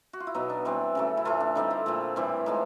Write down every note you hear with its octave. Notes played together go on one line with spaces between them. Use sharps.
F#4
F4
E4
B2 F#3 B3 D#4
D4
E3 G3 C4
C#3 F#3 A3
E4
A2 E3 A3 F4
D4
D3 G3 C4 D#4
E4
A#2 F3 A3
A2 E3 G3 C4 E4
A2 F3 G#3 D#4